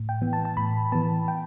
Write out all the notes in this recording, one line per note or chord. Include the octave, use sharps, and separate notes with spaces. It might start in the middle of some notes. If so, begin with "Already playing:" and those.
Already playing: A2
G5
E3 B3
A5
A5
A2 B5
E3 B3 A5
G5